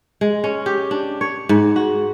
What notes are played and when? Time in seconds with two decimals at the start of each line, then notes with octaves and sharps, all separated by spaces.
0.21 G#3
0.44 C#4
0.66 G4
0.91 D4
1.21 C#5
1.49 G#2
1.76 F#4